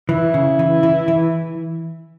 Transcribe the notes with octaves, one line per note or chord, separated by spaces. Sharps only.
E3 E4
C#3
E3
E3
E3